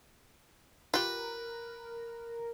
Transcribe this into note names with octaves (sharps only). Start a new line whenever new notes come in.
F4 G4 A#4 B4